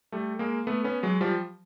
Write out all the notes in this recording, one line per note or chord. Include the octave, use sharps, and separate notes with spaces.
G3 A3
G#3 A#3
A3 B3
B3 C#4
F#3 G#3
F3 G3